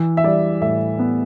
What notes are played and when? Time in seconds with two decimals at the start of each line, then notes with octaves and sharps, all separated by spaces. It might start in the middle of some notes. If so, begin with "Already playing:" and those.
Already playing: E3
0.17 E5
0.24 G3 D5
0.61 A2 E5
0.99 B3